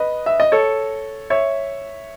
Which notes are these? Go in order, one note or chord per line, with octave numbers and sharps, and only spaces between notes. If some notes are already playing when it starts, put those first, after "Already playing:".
Already playing: B4 D#5
E5
D#5
A4 C#5
C#5 E5